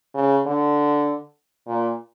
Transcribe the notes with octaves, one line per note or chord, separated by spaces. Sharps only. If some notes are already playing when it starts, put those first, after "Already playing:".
C#3
D3
A#2